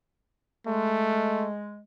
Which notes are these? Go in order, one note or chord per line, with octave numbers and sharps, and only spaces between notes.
G#3 A3